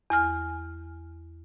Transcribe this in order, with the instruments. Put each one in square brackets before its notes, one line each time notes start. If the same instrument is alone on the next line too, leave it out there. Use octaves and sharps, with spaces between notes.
[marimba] E2 G#5 F6